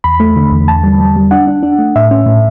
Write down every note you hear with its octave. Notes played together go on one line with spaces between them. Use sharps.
E2 B5
A3
D3
E2
D3 A5
G3
G3
G3
D4 F#5
D4
D4
A3
A2 E5
C#4
A2